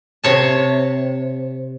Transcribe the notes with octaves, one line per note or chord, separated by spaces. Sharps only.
C3 C#5 A5